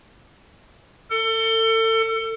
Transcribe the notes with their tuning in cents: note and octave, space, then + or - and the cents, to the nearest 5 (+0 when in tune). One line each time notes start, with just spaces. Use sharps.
A4 +30